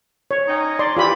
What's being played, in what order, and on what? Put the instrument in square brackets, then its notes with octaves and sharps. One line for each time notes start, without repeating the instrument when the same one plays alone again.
[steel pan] C#5
[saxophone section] C#4 D#4
[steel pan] D5 C6
[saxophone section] E3 [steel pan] F4 G4 B5